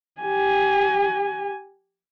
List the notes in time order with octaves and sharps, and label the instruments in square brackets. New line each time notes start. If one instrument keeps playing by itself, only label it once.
[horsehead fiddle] G4 G#5